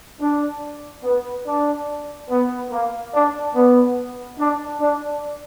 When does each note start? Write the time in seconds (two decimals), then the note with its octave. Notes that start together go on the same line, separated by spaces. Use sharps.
0.21 D4
1.04 B3
1.46 D4
2.29 B3
2.71 A#3
3.13 D4
3.55 B3
4.39 D4
4.81 D4